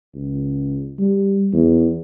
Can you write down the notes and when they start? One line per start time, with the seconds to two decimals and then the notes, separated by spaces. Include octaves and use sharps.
0.15 C#2
0.99 G3
1.53 E2